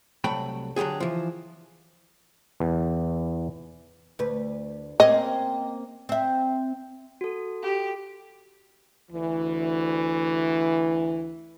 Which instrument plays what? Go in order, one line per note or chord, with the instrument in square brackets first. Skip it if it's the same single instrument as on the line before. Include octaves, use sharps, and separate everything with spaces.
[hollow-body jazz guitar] C2 F#3 A3 G5 B5
D3 F#3 G#3 G4 G#4
E3 F3
[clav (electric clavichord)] E2
[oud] D2 B4
[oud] A#3 C4 C#4 [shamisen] D#5
[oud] C4 E5
[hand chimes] F#4 A4
[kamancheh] G4
[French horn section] D2 E3